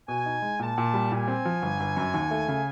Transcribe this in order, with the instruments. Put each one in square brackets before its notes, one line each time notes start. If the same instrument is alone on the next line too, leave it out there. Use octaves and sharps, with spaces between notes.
[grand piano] B2 [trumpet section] G#5
[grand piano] D#4
G#3
[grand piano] A#2 [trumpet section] A5
[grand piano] A#2
G3
[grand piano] A#2 [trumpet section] G#5
[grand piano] C4
F3
G1
G1
F#2
D#2
A3
C#3